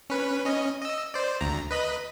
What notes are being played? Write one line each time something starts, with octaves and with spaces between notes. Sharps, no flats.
C#4 B4
C#4 D#5
D#5 E6
C5 D5
D2 A#5
B4 D#5 B5